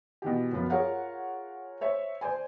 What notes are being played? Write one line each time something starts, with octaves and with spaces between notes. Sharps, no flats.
B2 E3 G4
F#2 F3 B3 F4
F4 G#4 A#4 C#5 F5 F#5
C5 C#5 E5
C5 D5 G#5